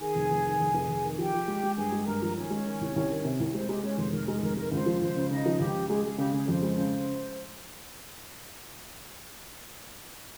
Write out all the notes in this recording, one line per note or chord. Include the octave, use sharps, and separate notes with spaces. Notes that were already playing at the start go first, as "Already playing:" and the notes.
D#3 G#4 G#5
F1
F1
D#3
F1
F1
F1
D#3
F3 G4 G5
F3
G#3
G#3
G2 G#4 G#5
G#3
G2 A#4 A#5
F3
D#3 C#4 C#5
G#3
D#3
C2
C2
D#3
C3
C2
G#3 C5
G#3 G4
G#3 C#4 C#5
F1 C5
F1 A#4
G#3 A#4
F1 A#4
G#3 A#4
C#2 C5
F3
C#2 C5
C#3
C#3 D#4 D#5
F3
C#2 G4
C#3
G#3 G#4
G#3 G#4
C#3 G4
C#3 G#4
F2 C5
G#3
C#3